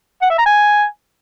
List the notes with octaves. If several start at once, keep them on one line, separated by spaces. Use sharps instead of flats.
F#5
E5
A#5
G#5